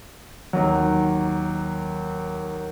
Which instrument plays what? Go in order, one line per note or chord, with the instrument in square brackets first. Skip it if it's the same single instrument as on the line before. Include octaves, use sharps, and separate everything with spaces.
[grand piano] D#2 F#3